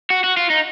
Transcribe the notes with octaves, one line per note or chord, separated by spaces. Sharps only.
F#4
F#4
F4
D#4